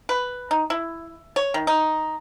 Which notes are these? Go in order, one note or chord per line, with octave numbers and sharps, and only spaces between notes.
B4
D#4
E4
C#5
D#3
D#4